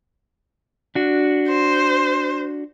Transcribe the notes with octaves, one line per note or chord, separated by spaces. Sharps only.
D4 F#4
C5